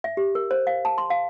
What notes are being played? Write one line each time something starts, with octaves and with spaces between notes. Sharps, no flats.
E5
G4
A#4
C5
F5
A5
C6
F5